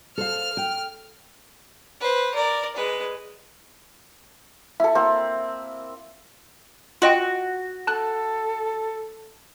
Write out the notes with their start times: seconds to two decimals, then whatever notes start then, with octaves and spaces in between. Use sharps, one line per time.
0.18 A4 C5 F5 F6
0.57 G5
2.01 B4 C5
2.34 A#4 D5
2.76 G#3 B4
4.80 E4 A4 E5
4.95 A#3 C4
7.02 F4 F#4 D#5 G5
7.87 A4 A5 F#6